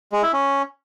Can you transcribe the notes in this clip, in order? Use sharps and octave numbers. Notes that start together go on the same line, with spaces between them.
G#3
E4
C#4